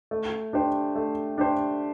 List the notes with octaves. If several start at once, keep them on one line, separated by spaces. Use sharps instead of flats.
A3
D4 G4 C5
A3
D4 G4 C5